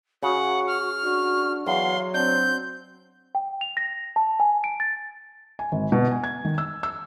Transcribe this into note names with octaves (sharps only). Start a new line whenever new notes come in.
C#3 F#4 F#5
F6
D4 F#4
E2 F#3 F5 C6
C4 D4 G6
G5
F7
A#6
A5
G#5
D7
A6
G#5
G#1
B2
G#5
G#6
D#3
E6
E6